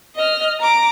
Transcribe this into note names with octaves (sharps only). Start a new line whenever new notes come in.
D#5 F6
A#5 D6